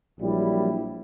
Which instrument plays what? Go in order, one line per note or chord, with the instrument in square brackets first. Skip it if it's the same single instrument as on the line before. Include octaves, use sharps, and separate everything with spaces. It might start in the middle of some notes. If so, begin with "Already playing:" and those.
[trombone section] A#1 F#3 G3 E4